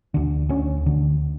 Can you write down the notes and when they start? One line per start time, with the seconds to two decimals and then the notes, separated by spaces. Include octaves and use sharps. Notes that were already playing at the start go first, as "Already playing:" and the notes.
0.14 D2 D3
0.49 D2 D3 C#4
0.86 D2 D3